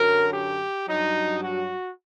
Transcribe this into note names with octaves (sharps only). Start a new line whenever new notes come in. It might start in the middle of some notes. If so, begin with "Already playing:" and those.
Already playing: F#2 D3 F#3 A#4
G4
G2 F#3 D#4
F#4